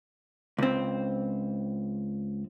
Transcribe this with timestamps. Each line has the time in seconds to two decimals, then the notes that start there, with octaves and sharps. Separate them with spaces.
0.58 C#2 C4